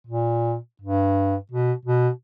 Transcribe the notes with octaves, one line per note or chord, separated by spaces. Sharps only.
A#2
G2
B2
B2